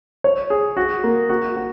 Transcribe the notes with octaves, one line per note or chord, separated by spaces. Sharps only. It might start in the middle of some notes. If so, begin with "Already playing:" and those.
C#5
G#4
F#4
A#3
F#4
F#4